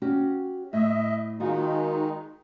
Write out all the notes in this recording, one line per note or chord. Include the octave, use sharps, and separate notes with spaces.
C#4 F#4 G4
A2 D#5 E5
D#3 G#3 D#4 F4 F#4